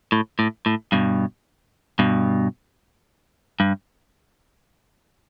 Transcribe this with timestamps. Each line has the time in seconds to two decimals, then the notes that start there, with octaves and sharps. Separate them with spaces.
0.12 A2
0.39 A2
0.66 A2
0.92 G2 B2
1.99 G2 B2
3.60 G2